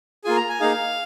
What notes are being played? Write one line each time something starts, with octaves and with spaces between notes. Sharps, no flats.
A#3 F4 G#4 G#5
A#5
G#5
A#3 D#4 G#4 F5